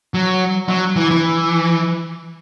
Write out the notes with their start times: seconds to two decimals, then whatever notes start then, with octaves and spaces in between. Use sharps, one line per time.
0.14 F#3
0.69 F#3
0.96 E3
1.11 E3